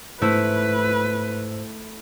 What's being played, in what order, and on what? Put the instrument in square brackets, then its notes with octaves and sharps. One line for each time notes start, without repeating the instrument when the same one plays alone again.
[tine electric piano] G#2 C5 E6 [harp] A3 E4 [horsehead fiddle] B4